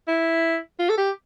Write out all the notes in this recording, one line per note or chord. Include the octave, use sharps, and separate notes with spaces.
E4
F4
A4
G4